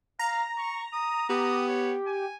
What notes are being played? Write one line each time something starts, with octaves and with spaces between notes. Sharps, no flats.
F5 A#5
C#6
D#6
B3 G4 D#6
C#5
G#5